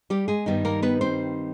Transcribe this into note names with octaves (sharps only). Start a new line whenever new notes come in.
G3 G4
G#3 G#4
G2 D#3 G3 B3 D#4
A#3 A#4
B3 B4
C4 C5